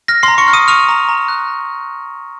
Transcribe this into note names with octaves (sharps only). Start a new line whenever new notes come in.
F6 A#6
C6 C7
A#5
C#6 C#7
F6
D#6 D#7
C#6 F6 F7
A#5
A#5
F#6